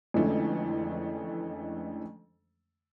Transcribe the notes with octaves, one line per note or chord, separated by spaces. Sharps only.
F2 D3 E3 G#3 A3 C#4